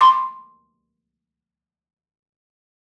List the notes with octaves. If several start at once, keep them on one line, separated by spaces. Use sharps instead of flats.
B5 C6 D6